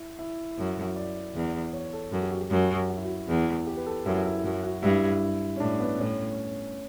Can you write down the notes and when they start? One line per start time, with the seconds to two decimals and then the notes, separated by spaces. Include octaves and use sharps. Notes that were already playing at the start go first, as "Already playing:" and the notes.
Already playing: E4
0.19 E4
0.58 F#2
0.96 D5
1.35 E2
1.73 C#5
1.93 A4
2.12 F#2 A4
2.22 G4
2.31 F#4
2.41 G4
2.51 F#2
2.90 F#4
2.97 E4
3.04 F#4
3.28 E2 E4
3.67 G4
3.77 B4
3.87 A4
4.06 F#2 E4
4.26 E4
4.44 F#2 E4
4.63 F#4
4.83 G2 E4
5.56 C#4
5.60 A2 D4
5.80 B3
5.99 A2 C#4